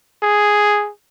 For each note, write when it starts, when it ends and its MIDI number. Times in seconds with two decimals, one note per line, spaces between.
0.23 0.90 68